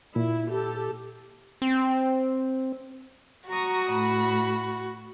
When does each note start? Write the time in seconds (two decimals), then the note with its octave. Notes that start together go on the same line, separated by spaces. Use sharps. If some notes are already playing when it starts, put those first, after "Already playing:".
0.16 A#2 E4
0.50 G4 A4
1.62 C4
3.49 F#4 A#5 C#6 D#6
3.92 A2 B5